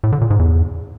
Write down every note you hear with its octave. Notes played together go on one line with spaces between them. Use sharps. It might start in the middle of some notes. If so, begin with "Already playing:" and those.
A2
D3
A#2
G#2
E2